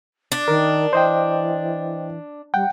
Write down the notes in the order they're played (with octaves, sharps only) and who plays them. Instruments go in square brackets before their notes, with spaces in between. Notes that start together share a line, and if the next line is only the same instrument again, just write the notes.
[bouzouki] D4
[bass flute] D#3 [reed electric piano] A#4
[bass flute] E3 [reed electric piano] C5 D#5 G5
[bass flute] G3 [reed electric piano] F#5 G5